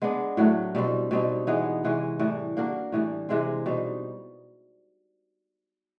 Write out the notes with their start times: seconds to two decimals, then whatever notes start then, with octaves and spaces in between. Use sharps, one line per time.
0.02 G#3 B3 D4
0.37 A2 F#3 A3
0.75 B2 G3 C4
1.11 B2 G3 C4 D#4
1.47 E3 G#3 B3 D#4
1.84 C3 E3 G#3 C#4
2.19 A2 E3 G3
2.57 A#3 D4 F#4 A#4
2.92 A2 E3 G3
3.29 C3 E3 G#3 C4
3.66 B2 G3 C4 D#4